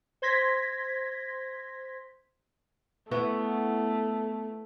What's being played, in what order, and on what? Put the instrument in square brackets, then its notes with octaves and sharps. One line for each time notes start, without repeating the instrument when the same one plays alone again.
[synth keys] C5 C6 G#6 A#6 B6
[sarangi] A3 [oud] B3 E4 F#4